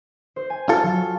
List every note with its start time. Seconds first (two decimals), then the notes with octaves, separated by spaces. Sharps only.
0.36 C5
0.50 G#5
0.69 F4 A4
0.83 F#3